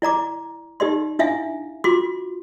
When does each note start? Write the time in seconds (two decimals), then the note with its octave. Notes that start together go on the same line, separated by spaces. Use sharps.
0.02 E4 D5 A#5 D6
0.80 D#4 G4 D5 C6
1.19 D4 E4 E5 F5 G#5
1.84 F4 F#4 C6 D6